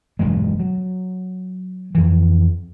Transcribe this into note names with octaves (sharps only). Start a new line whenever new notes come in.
E1 G2 F#3 G#3
F#3
F2 E3